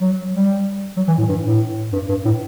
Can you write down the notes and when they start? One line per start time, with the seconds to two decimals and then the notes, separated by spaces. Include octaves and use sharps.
0.01 F#3
0.33 G3
0.97 F#3
1.07 E3
1.18 A2
1.29 G2
1.45 A2
1.93 G2
2.09 G2
2.25 A2